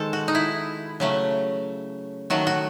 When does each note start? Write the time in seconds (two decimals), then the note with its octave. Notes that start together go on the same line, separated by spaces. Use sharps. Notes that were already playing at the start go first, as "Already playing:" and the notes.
Already playing: D#3 G#3 A4 C5
0.13 F#4
0.28 D#4
0.35 E4
1.00 C#3 F#3 A3
2.30 D#3 F#3 A3 F#4
2.47 F#4